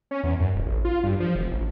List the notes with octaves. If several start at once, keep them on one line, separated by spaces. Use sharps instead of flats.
C#4
E2
F#2
D#1
A1
F4
G2
F3
F1
A1